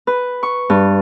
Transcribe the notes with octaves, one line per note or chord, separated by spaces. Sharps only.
B4
C#6
G2